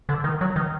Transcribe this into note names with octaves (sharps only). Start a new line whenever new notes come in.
D3
D#3
F#3
D#3